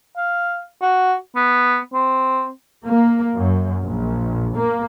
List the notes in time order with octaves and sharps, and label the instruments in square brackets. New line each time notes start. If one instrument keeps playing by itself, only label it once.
[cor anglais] F5
F#4
B3
C4
[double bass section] A#3
F#2
A#1
A#3